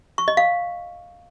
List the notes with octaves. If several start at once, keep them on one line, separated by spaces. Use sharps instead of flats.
C#6
D#5
F5